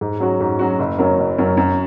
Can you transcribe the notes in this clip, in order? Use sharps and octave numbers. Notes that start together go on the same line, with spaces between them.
G#2
F#3 C#4 F#4
G#2
F#3 C#4 F#4
F#1
F#2 F#3 C#4 A#4
F#1
F#2 F#3 C#4 A#4
F#2